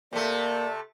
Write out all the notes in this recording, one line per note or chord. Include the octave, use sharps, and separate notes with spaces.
C3 A3 A#3 D5